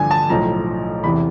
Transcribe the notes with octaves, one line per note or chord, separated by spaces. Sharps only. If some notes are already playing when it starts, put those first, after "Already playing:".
Already playing: A1 G2 D3 F3 G#5
A5
B1 A2 F3 A#5
E2 C3 E3 B5